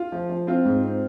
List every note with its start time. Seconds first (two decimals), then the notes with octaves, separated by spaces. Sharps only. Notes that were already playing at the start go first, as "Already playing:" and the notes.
Already playing: F4
0.12 F3
0.29 F3
0.47 C4 F4
0.65 G#2
0.83 C4